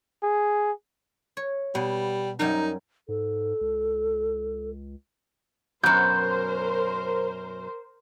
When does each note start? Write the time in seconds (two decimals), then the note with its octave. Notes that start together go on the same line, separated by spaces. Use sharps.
0.23 G#4
1.37 C#5
1.75 B2 G3
2.39 F#2 G3 D#4 A#4
3.08 G#2 A4
3.61 C#2
5.83 F#2 B2 A#4 C5 G6